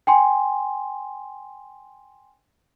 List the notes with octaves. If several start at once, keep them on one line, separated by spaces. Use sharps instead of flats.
G5 G#5 C6